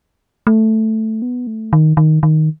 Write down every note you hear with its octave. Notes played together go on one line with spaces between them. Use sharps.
A3
B3
A3
D#3
D#3
D#3